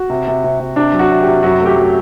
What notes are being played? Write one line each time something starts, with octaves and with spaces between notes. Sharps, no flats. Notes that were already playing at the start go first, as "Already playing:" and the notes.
Already playing: F#4
C3
C3
C3
C3
C3 D4
F#3
F#4
C3
G4
C3
F#2 F#4
A3 G4
F#3